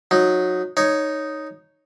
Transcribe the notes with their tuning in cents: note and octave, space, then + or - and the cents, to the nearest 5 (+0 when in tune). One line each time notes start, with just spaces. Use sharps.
F#3 -20 D#4 +0
D#4 +0 C#5 +0